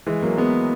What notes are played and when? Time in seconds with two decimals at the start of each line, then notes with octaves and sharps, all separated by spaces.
0.07 E3 G#3
0.22 F#3 A#3
0.37 G#3 B3